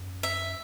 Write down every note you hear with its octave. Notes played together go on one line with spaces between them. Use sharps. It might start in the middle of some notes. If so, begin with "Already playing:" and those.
Already playing: F#2
E5